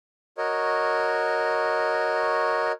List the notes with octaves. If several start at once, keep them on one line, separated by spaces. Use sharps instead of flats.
F#4 A#4 C#5 D#5